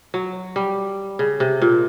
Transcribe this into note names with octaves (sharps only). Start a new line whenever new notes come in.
F#3
G3
C#3
C3
A#2